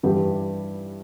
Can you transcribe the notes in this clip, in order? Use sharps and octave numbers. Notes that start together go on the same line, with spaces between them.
G2 E3 G4